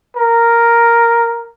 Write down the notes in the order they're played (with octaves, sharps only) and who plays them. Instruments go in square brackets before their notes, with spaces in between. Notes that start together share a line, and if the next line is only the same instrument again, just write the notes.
[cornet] A#4